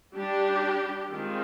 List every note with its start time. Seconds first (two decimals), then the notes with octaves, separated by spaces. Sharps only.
0.14 G3 D4 G4
1.10 D#3 G#3 C4 F4